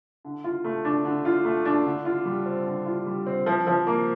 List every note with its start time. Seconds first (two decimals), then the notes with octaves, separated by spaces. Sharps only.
0.25 D3
0.44 F4
0.64 A3
0.85 D4
1.05 D3
1.25 F4
1.45 A3
1.65 D4
1.86 D3
2.05 F4
2.25 G3
2.46 C4
2.66 D3
2.86 F4
3.06 G3
3.26 C4
3.46 F3
3.67 F3
3.87 A#3